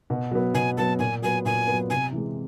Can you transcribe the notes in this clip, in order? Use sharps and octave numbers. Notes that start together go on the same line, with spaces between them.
B2
F#3 B3
B2 G#5
F#3 B3 A5
A#2 G#5
F#3 B3 G#5
A#2 G#5
F#3 B3
C3 G#5
E3 G#3